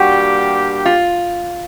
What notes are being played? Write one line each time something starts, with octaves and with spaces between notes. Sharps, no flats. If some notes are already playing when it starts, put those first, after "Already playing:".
Already playing: G3 A#3 D4 F#4 G4
F4